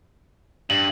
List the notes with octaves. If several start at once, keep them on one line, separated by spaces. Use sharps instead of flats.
G2 F#7